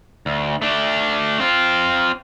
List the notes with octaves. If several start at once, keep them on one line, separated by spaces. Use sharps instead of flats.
D2
A3 D4
C4 F4